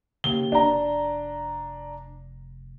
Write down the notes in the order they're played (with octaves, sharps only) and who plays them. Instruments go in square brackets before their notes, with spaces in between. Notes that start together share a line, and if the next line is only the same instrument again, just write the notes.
[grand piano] D#2 G7 [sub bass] C#3
[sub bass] F1 [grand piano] D4 A#5